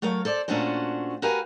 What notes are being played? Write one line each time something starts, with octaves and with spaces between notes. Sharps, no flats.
F#3 A3 A#4 C#5 F5
A4 C5 D5
A#2 A3 C#4 D4 F#4 C5
F#4 G4 A#4 B4 F5 G#5